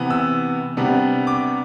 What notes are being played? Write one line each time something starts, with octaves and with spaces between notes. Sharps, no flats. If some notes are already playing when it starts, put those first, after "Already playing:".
Already playing: C3 E3 B3
E6
C3 G3 B3 D4
D6